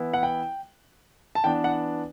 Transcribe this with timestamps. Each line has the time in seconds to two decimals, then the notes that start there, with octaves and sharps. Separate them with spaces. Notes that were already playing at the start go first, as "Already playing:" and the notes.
Already playing: E3 B3 E4
0.14 F#5
0.23 G5
1.35 A5
1.44 E3 B3 D4 G5
1.64 F#5